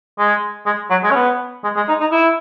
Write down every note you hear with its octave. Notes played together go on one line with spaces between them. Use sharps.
G#3
G#3
F#3
G#3
C#4
B3
G#3
G#3
D#4
D#4
E4